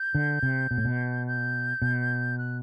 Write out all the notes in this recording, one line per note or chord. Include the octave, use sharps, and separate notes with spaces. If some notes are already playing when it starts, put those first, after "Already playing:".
Already playing: G6
D3
C3
B2
A2
B2
G6
B2
F#6